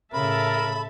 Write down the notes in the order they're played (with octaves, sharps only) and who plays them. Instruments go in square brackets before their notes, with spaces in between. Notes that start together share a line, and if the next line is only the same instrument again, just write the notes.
[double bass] A2 C#3 [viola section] A4 E5 A5 [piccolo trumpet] A#4 [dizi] B5